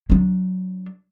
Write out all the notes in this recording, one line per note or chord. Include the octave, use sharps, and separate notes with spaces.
F#3 D4